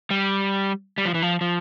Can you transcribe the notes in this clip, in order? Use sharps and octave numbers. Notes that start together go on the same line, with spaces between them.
G3
G3
F3
E3
F3
F3